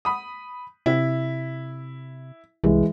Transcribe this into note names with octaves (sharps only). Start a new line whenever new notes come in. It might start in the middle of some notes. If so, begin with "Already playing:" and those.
B5 D#6
C3 E4
C2 E3 G#3